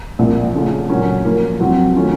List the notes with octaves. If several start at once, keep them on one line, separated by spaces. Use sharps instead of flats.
C2 A#2 F3 A#3 F4
C#3 A3 C#4 F4
A#2 F#3 A#3 C#4
F3 A#3 F4
F2 C3 F#3 C4 F#4
D#3 A3 C#4 F4